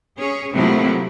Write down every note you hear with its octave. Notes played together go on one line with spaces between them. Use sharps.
C#4 G#4 C#5
C3 F3 F#3 A3 A#3 E4